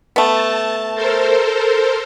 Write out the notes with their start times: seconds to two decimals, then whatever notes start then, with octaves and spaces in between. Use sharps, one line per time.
0.16 A3 B3 A5
0.95 A4 A#4 C5